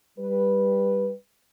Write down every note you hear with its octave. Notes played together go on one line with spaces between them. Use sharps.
G3 B4